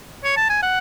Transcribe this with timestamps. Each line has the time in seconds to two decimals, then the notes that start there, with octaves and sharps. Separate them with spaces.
0.24 C#5
0.37 A5
0.50 G#5
0.63 F#5